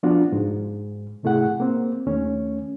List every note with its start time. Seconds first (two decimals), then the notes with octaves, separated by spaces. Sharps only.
0.03 F3 B3 D4 F4 F#4
0.32 G#2
1.23 G#2 C3 A3 E4 G#4 F#5
1.60 A#3 C4
2.07 D#2 A3 C#4